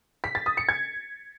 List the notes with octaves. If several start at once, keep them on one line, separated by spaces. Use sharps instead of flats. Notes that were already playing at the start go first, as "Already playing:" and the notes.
B6
A6
D#6
C#7
G#6